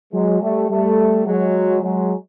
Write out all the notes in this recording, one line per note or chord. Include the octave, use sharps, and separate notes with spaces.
F#3 G#3
G3 A3
G3 A3
F#3 G#3
F#3 G#3